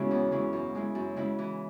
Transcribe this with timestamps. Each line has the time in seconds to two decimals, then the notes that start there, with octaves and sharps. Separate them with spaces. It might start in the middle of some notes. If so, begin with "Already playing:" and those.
Already playing: C#3 G#3 B3 C#4 E4 F#4
0.11 E2
0.32 C#3 G#3 C#4 E4
0.53 F#2
0.75 C#3 G#3 E4
0.95 F#2
1.16 C#3 G#3 E4
1.39 E3